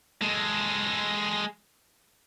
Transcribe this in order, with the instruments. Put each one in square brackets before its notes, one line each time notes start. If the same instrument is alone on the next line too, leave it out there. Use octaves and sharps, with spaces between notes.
[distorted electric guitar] G#3 A4